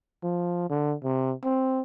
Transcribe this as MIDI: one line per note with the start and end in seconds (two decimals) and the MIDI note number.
0.23 0.67 53
0.70 0.95 50
1.03 1.33 48
1.44 1.81 60